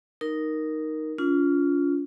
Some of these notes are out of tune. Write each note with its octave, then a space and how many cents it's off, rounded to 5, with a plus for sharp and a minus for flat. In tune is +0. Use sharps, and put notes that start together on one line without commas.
D#4 +0 A#4 +0
C#4 +40 F4 +0